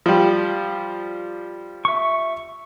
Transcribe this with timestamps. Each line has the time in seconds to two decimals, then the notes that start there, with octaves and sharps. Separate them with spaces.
0.06 F3 G3
1.85 E5 C#6